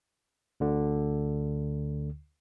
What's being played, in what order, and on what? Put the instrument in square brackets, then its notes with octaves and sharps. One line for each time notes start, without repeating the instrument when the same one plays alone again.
[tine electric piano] D2 D3